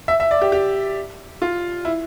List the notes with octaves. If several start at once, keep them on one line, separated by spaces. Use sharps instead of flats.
E5
E5
D5
G4
G4
F4
E4